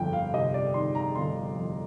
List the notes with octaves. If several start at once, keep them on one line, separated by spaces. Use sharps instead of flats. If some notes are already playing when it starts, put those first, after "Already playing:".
Already playing: G1 F2 G5
F5
C3 D#5
D5
D#3 C6
A#5
G1 C6
F2